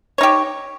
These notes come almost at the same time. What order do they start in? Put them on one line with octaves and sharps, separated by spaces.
C#5 D#4 G4